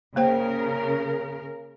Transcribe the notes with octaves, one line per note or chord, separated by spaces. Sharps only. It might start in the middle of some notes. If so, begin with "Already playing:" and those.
C#3 A#3 A#4 C5 G5